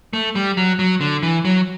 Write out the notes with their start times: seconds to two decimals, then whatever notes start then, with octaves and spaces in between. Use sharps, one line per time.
0.13 A3
0.35 G3
0.57 F#3
0.79 F#3
1.01 D3
1.23 E3
1.45 F#3